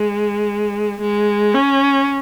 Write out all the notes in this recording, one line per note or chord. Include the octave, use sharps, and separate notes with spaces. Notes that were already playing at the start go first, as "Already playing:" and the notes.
Already playing: G#3
G#3
C#4